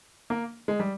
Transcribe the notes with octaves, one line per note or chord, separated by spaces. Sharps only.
A#3
G#3
G3